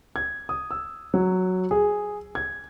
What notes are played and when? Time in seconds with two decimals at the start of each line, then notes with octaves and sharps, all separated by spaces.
0.16 G#6
0.49 D#6
0.71 E6
1.14 F#3
1.71 G#4
2.35 G#6